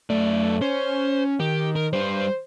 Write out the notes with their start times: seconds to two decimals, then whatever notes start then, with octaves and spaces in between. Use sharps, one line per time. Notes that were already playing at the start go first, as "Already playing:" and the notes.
0.10 F#2 A3 D5
0.61 C#4 C5
1.40 D#3 G4
1.76 A#4
1.93 G3 B4 C5